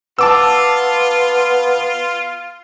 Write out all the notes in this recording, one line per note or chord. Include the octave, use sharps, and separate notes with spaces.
B3 F4 A5 D6 E6